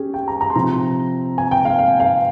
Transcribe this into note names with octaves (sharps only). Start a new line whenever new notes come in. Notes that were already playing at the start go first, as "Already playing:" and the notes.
Already playing: C#4 G4 G#4
G5
A#5
A#5
C6
C3 F3 C4 A#5
G#5
G5
F5
F5
F5